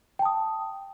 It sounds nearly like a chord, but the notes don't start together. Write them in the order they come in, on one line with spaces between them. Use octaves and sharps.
G5 A5 D#6